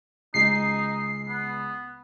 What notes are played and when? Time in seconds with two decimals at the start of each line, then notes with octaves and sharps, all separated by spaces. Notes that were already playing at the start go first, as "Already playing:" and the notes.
0.34 C#2 G#3 D#4 C7
1.29 B3